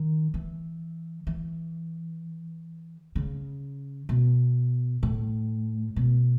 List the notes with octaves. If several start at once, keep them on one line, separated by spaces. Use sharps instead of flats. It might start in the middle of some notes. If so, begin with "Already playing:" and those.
Already playing: D#3
E3
E3
C#3
B2
A2
B2